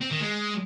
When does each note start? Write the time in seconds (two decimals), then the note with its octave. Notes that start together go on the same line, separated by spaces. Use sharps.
0.02 C4
0.11 D#3
0.21 G#3